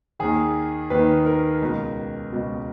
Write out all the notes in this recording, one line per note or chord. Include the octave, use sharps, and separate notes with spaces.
D#2 D#3 G#4
D#2 D#3 B4
A#4
C#2 B2
C#2 B2